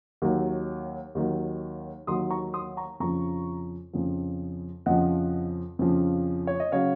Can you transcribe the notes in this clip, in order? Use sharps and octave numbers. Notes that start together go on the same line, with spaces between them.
D#2 D#3 F#3
D#2 D#3 F#3
D#2 D#3 F#3 C6 D#6
A#5 C#6
C6 D#6
A#5 C#6
F2 C#3 F3 A#5 C#6
F2 C#3 F3
F2 C#3 F3 D#5 F#5
F2 C#3 F3
C#5
D#5
C#3 F#3 C#5 F5